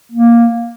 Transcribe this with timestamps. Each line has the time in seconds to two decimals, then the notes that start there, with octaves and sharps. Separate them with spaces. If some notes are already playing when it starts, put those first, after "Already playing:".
0.12 A#3